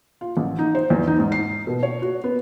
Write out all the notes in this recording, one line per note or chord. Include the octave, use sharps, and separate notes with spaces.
F4
A1
D#4
C5
E2
D#4
G#2
C7
B2
C#5
F#4
B3